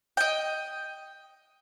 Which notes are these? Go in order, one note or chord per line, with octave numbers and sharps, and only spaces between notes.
D#5 G5